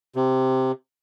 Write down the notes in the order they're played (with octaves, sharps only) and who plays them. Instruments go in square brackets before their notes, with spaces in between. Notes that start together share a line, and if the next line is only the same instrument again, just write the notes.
[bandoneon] C3